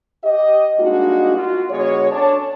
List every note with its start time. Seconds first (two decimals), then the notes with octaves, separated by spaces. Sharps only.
0.24 G4 D#5
0.79 G3 G#3 A#3 D4 D#4 F#4
1.37 F4 F#4
1.70 D3 G#3 B3 F#4 C#5
2.11 C#4 D4 A4 C#5 D5 A5